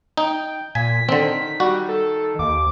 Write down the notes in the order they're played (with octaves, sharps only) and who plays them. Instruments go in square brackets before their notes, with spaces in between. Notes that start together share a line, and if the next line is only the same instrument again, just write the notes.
[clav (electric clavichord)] D#4 [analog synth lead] G5
[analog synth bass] A#2 [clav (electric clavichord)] G#5 [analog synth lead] B6
[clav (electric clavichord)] D3 C4 [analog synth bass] D#3
[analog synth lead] G3 [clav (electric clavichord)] F#4
[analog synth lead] A4
[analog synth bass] D#2 [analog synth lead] D6